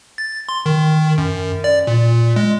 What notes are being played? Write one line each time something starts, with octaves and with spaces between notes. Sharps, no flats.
A6
C6
D#3
F#2
D5
A#2
G#3